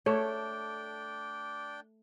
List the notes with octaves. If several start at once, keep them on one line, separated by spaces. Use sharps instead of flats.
A3 D4 C#5 D5 G5